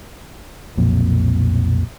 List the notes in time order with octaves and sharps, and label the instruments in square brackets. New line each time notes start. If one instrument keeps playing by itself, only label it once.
[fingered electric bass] B1 F2 A#2